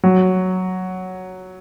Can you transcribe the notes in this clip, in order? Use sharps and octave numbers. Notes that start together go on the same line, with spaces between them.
F#3